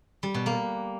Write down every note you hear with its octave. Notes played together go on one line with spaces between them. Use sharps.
G3
B2
A#3